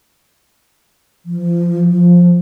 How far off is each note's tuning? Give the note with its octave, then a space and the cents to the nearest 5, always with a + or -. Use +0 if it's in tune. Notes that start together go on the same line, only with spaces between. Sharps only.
F3 -30
F3 +5